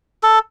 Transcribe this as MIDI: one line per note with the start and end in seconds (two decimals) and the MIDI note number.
0.23 0.39 69